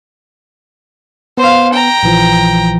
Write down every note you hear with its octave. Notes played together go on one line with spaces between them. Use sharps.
B3 C5 F5
G5 A#5
A#1 E3 F3